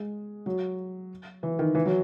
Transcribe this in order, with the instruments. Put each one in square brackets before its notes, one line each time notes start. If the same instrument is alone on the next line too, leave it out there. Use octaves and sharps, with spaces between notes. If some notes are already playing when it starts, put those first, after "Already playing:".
Already playing: [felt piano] G#3
F#3
E3
D#3
E3
F#3